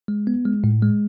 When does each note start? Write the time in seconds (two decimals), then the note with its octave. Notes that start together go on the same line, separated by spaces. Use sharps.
0.08 G#3
0.27 B3
0.45 G#3
0.64 A2
0.83 G#3